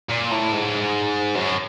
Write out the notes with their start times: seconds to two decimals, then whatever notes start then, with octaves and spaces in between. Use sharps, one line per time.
0.09 A#2
0.31 A2
0.52 G#2
1.36 F#2